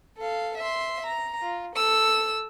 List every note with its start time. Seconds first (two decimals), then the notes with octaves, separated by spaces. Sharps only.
0.17 A4 F5
0.58 E5 C6
1.06 A#5
1.42 F4
1.75 A4 E6